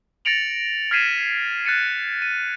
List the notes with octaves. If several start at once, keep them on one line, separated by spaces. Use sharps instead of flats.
A6 A#6 C#7 D7 F7 F#7
F6 G#6 B6 C7 D#7 E7
F#6 A6 C#7 D#7
D#7